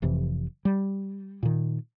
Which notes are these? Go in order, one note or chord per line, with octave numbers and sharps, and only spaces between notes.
F1 F2 C3 E3
G3
A#2 D#3